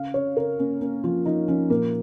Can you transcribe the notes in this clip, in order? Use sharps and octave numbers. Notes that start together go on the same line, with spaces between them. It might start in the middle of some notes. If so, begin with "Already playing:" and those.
Already playing: C#3 F5
C#3 C#5
C#3 A#4
A#3 C#4
A#3 C#4
F3 F4
F3 D#4
F3 C#4
A#2 A#3